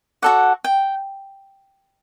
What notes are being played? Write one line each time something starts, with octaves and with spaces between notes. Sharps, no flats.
F#4 A4 D5 F#5
G5